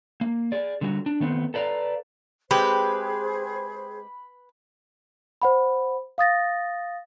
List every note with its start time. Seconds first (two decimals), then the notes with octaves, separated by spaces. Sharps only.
0.21 A#3
0.52 G#4 D5
0.81 D3 G3 F#4
1.06 D4
1.20 D#3 A3 B3 C4
1.54 A4 B4 D5 F5 A#5
2.51 G#3 C4 G4 G#4 B4 C5 B5
5.42 C5 F#5 B5
6.18 F5 D#6 A6 A#6